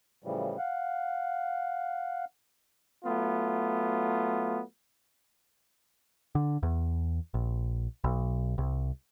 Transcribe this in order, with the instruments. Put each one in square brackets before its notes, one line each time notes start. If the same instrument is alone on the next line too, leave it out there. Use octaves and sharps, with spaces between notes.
[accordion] A2 C#3 E3 F3 G3
F5 F#5
[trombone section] F#3 A3 B3 F4
[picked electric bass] D3
E2
A#1
B1
C2